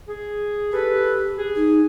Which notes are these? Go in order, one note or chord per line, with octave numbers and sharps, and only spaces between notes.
G#4
G4 A4 B4
G#4
D#4